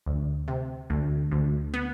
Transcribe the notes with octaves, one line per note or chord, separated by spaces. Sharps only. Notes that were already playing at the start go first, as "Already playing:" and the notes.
D2
C3
D2
D2
B3